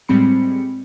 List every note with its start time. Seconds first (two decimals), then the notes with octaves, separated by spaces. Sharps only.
0.08 A2 G3 G#3 C4 B5 C#7